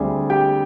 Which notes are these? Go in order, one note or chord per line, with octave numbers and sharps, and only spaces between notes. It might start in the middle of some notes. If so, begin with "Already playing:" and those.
Already playing: D2 D3 G3 C4 G#4 G#5
G4 G5